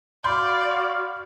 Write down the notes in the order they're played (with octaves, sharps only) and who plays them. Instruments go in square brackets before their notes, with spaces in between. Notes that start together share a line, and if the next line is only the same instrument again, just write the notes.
[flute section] F#4 F5 F6 [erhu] D5 [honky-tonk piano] B5 C6 G6